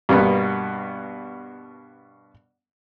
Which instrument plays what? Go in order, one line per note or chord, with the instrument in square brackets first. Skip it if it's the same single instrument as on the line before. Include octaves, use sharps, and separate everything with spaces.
[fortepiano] G2 B2 A#3 B3